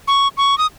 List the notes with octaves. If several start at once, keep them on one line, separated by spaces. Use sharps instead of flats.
C#6
C#6
D#6